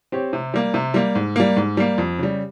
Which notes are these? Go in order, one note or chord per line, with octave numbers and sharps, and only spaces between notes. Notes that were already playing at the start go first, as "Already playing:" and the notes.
C4 G4 C#5
C3
G3 A#3
C3
G3 A#3
G#2
G3 A#3
G#2
G3 A#3
F2
C#3 G3